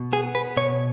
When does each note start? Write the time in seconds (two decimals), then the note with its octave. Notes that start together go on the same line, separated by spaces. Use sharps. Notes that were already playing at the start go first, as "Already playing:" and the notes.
Already playing: B2
0.13 B3 G#4
0.35 B4
0.57 B2 C#5